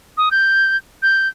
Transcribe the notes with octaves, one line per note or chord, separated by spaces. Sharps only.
D#6
G6
G6